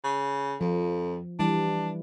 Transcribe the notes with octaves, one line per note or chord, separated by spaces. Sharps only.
C#3
F2 F3
E3 G3 D4